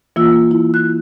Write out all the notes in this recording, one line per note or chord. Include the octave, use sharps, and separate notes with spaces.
E3 A#3 F4 E6
A#3
E4
F#6